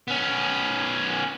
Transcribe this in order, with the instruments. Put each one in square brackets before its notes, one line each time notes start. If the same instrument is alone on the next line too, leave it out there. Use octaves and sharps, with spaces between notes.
[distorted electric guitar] B3 C#4